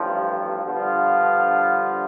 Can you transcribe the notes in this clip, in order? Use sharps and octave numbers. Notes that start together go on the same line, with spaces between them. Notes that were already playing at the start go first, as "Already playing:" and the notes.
Already playing: A1 G2 F3
G2 D3 F3 B3 F4